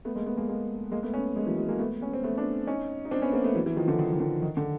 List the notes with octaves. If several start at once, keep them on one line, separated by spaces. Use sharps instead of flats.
A3 B3
G#3 A#3
A3 B3
G#3 A#3
G#3 A#3
G#3 A#3
A3 B3
B3 C#4
G#3 A#3
E3 F#3
F#3 G#3
G#3 A#3
A3 B3
B3 C#4
C4
A3 B3
C4 D4
C#4 D#4
D#4
C4 D4
B3 C#4
A#3 C4
A3 B3
E3 F#3
E3 F#3
D#3 F3
D3 E3
D#3
D#3
D3
D#3
D3